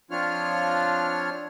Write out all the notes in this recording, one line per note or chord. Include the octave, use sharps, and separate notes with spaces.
F3 C4 D4 F4 C#5 F6